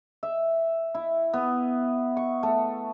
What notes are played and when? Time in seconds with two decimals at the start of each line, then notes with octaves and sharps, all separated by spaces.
0.23 E5
0.95 E4
1.34 B3
2.17 C#6
2.43 A3